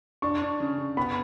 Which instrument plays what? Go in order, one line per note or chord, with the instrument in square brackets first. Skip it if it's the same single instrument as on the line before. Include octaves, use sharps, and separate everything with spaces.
[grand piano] D4 [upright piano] C#6
[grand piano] D4
C#3
C#3
[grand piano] B3 [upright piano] B5